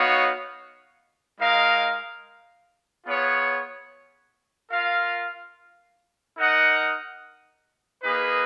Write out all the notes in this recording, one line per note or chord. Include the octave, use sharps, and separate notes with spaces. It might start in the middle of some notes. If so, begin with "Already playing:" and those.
Already playing: B3 D#4 F#4 C#5 F5
G#3 D#4 A#4 F5
B3 F4 G#4 C#5
F4 A#4 F5
D#4 A#4 D#5 F#5
A#3 D#4 G#4 B4